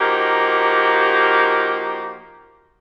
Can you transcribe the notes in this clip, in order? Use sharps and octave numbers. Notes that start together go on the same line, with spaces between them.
F3 A#3 D#4 F#4 G4 A#4